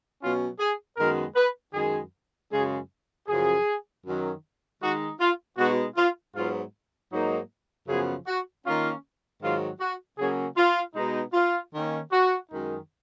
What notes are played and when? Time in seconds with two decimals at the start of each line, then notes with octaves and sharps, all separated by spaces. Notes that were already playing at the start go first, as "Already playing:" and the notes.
0.20 B2 F#3 C#4 F4
0.59 G#4
0.97 F#2 D#3 G#3 B3 A#4
1.35 B4
1.74 F#2 D#3 G#3 G#4
2.51 F#2 C#3 G#3 C#4 G#4
3.28 F#2 C#3 F3 G#4
4.04 F#2 D#3 F#3 C#4
4.81 D#3 G#3 D#4 F#4
5.19 F4
5.57 B2 G#3 B3 D#4 F#4
5.96 F4
6.35 G#2 F#3 B3 F4
7.11 G#2 F#3 A#3 D#4
7.88 F#2 C#3 F3 B3 G#4
8.27 F#4
8.65 D#3 A#3 C#4 F4
9.42 G#2 D#3 F#3 F4
9.80 F#4
10.18 C#3 F#3 A#3 C#4 G#4
10.57 F4
10.95 B2 G#3 B3 D#4
11.33 F4
11.73 D#3 A#3 C#4
12.11 F#4
12.49 F#2 D#3 G#3 D#4